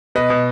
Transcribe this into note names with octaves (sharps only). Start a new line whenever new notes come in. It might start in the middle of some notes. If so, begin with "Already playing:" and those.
B2 B4 D#5
B2